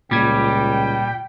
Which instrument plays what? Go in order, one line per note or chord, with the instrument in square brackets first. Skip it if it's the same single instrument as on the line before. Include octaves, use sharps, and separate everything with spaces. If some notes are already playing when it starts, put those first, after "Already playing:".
[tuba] C#2 [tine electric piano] A#2 G#6 [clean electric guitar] G3 [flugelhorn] G5